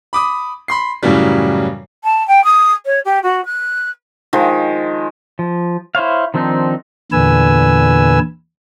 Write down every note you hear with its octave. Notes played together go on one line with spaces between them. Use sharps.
B5 D6 D#6
B5 C6 C7
F#2 A2 C#3 E3 F#3 G3
A5
G5
D#6
C#5
G4
F#4
F#6
D#3 F3 G#3
F3
E4 C5 C#5 F5
D#3 F3 C4 D4 D#4
E2 A#2 D3 B4 G#5 E6